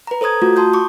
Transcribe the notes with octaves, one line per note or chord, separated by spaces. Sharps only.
B4 A#5
A4 C5 A#5 D#6 G#6
A3 F4 F#4
A5 C6 D#6 G6
C#6 D6